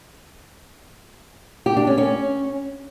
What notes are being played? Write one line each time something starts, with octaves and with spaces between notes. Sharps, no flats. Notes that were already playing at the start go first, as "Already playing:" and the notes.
G4
D4
C#4
C#4